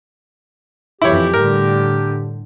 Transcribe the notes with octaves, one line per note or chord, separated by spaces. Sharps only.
F2 E3 E4 G4 C#5
A2 D3 G3 A#4